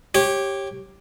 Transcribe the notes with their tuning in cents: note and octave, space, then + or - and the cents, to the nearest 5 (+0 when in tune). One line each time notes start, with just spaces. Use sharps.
G4 +0 C#5 -20